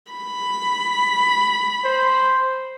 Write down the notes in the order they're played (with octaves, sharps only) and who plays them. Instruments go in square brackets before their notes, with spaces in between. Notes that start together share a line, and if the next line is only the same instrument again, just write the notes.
[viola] B5
[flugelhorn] C5